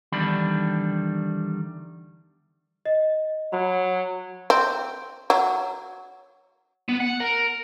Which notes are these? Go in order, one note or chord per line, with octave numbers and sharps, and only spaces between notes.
E2 D3 D#3 G3 D4 B5
D#5
F#3 B5
C4
F#3
B3
F#5
A#4